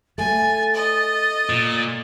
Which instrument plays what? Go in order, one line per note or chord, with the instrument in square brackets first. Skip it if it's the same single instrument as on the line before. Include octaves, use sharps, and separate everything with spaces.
[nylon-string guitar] A3 [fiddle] G#5 [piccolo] A6
[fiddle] D#5
[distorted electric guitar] A#2